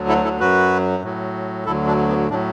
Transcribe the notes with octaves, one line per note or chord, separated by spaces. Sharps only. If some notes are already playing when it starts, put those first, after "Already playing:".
Already playing: D2 D3 F#3
E4 A4
E4 A4
F#2 F#3 F#4 B4
A2 F#3
D2 D3 F#3 E4 A4
D4
B3
A2 F#3 D4